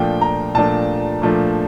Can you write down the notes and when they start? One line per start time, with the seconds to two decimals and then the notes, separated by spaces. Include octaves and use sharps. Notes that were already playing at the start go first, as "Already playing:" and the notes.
Already playing: A#2 F3 A3 D4 G5
0.21 A#5
0.55 A#2 F3 A3 D4 A5
1.22 A#2 F3 A3 D4